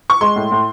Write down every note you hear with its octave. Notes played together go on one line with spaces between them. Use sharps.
C#6
G#3 C6
A2
A2